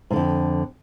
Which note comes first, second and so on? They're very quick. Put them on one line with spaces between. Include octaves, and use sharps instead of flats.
G#2 D3 F2